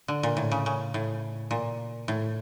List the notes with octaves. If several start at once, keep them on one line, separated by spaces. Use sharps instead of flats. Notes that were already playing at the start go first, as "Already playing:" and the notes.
D3
A#2
A2
C#3
C#3
A2
A#2
A2